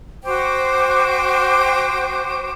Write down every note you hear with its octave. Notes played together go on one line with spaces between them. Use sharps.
F#4 C5 G5 D6